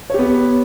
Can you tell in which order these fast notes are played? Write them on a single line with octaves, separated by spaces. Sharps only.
C#5 G4 B3